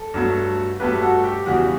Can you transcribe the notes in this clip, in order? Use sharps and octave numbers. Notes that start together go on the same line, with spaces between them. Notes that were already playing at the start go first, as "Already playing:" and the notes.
Already playing: A4
G2 F#3 A3
G2 F#3 A3 G4 B4
F#4 A4
G4
E2 C#3 G3 F#4